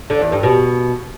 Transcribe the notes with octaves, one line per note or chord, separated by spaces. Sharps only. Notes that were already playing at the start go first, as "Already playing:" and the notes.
D3
E2
G2
B2